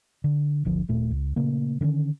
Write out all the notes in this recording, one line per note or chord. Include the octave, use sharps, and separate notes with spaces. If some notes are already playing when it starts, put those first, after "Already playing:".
D3
D1 G1 D3 F3
D#1 A#2 A3
C#2
A#2 C#3 A3 A#3
D3 D#3 A#3 C#4